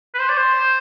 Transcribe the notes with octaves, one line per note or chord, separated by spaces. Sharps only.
B4
C5
D5
C5